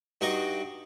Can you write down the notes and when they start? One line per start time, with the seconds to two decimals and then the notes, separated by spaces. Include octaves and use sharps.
0.21 G2 D#4 F#4 D#5 C#6 D6